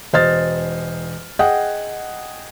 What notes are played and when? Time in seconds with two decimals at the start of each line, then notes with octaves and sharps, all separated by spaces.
0.13 E1 C5 D#5 F6 A6
1.39 G#4 D#5 F#5 G5